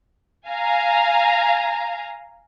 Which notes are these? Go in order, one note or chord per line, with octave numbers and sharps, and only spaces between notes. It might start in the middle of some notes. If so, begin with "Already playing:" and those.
F5 G#5 A#5